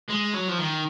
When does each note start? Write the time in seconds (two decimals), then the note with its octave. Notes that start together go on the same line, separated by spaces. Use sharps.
0.10 G#3
0.35 F#3
0.49 F3
0.59 D#3